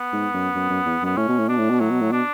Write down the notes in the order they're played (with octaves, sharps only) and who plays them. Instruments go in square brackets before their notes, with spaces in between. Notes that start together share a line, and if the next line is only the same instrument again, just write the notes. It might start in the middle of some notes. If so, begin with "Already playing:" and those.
Already playing: [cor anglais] B3
[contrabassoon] G#2
F#2
F#2
F#2
E2
[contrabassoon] F#2 [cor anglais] B3
[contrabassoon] A2 [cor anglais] C#4
[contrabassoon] B2
A2
[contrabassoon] B2 [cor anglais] D4
[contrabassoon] A2
B2
[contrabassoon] A2 [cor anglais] F#3
[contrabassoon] B2
A2
[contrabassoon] B2 [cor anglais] D4